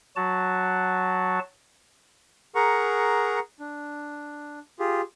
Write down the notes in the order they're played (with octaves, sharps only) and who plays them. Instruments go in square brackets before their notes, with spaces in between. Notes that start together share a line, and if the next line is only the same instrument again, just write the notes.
[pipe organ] F#3 F#4 A5
[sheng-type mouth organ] G#4 A#4 F#5 A#5 C#6
D4
F4 G4 G#4